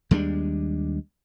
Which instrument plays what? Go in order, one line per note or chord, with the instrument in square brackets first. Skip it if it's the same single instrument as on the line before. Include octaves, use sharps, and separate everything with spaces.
[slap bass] D#2 G3 G#3 D4